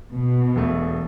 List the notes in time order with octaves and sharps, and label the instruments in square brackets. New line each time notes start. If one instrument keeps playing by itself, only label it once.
[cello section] B2
[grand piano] E1 A3